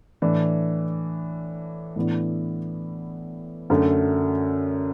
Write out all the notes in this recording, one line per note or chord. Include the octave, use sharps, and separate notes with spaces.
A2 E3 D4
A2 E3 B3 D4
F#2 D3 A3